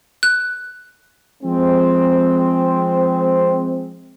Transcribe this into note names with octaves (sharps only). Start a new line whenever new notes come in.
F#6
F3 G#3 C4